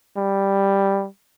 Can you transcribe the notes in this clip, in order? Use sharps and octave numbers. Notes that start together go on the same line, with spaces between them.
G3